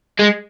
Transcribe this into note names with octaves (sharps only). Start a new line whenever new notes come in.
G#3